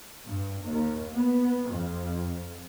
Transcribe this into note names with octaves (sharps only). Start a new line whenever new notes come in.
G2
D#2
B3
F2